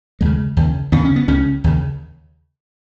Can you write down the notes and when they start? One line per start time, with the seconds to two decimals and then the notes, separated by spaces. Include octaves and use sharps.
0.21 D#2 C#3 G#3
0.57 D#2 C#3
0.92 D#2 C#3 B3
1.05 C#4
1.16 B3
1.28 C#2 C#3 C#4
1.64 D#2 C#3